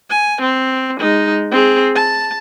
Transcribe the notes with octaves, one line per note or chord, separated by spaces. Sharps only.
G#5
C4
G#3 D#4
C4 G#4
A5